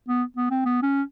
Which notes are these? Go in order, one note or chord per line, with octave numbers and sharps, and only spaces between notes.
B3
B3
C4
B3
C#4